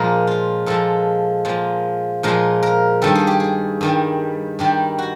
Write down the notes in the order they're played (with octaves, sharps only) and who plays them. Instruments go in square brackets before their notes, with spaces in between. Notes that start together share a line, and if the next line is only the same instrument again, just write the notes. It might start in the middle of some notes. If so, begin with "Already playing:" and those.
Already playing: [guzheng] A#2 F3 G#3 A#4
F4
A#2 F3 G#3 A4
A#2 F3 G#3
A#2 F3 G#3 A#4
A#4
G2 D#3 G3 A4
G#4
G4
G#4
G2 D#3 G3
G2 D#3 G3 G4
F#4